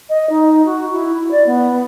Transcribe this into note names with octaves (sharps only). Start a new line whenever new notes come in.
D#5
D#4
F#4
E4
D5
B3